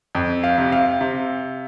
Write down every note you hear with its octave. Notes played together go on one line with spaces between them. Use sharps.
F2
F5
C3
F5
C3